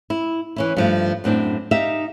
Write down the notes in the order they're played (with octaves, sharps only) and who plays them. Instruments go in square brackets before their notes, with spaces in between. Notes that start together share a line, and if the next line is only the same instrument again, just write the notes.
[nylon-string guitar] E4
E3 C#4 E4
G2 F3 A3
F#2 A2 C4 D4
D#4 G4 E5 F5